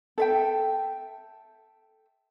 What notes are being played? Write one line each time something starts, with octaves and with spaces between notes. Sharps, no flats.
A4 E5 G5